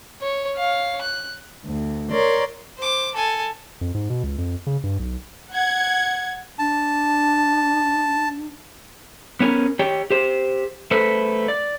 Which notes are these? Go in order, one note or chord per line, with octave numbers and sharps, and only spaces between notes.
C#5
C#5 F5
F#6
D2
A#4 C#5 D5 C6
C5 D6
A4 G#5
F2
G#2
B2
C#2
F2
C#3
G2
B1
F#5 G#6
D4 A5
B3 C#4 A#4
G4 C#5 G5
G4 C5
A3 A4 B4 C5
D5